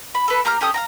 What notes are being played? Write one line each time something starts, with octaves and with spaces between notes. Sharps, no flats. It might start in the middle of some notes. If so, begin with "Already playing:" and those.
B5
A4 B4
A#3 G4 A#5 F6
C#4 G4 A4 D#6
F5 G5 A#5